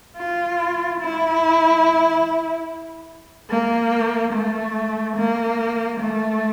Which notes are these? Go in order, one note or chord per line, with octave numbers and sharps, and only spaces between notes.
F4
E4
A#3
A3
A#3
A3